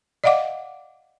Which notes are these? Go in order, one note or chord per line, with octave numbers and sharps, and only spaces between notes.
D5 D#5 F5 F#5 D6